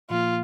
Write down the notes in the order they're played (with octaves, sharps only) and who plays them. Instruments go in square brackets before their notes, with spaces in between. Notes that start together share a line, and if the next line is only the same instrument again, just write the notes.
[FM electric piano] A#2 F3 A#3 [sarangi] F4